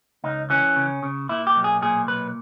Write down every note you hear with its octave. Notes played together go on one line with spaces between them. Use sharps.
C#2 D#4
E3 C#4
C#3
C#3
A#2 E4
G4
B1
G#4
A#2 G#4
B1 B4